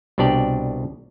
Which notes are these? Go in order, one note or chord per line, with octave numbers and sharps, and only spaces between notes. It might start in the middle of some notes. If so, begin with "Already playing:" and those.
C2 B2 D4 G4 D5 G5